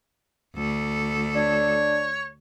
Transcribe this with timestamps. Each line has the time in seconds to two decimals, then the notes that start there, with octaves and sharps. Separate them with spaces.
0.56 D2 A4
1.36 D4 C#5